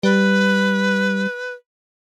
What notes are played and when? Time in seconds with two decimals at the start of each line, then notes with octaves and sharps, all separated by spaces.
0.03 G3 B4